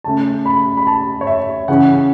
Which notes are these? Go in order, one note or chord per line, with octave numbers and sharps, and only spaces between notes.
C#3 A3 C#4 A5
B5
B5
A5
C#5
E5
C#3 E3 C#4 F#5